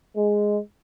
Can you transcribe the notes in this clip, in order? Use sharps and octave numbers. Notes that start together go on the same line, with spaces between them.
G#3